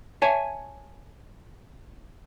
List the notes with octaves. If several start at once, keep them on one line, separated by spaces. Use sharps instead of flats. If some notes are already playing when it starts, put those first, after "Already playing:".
C#5 E5 G#5 A5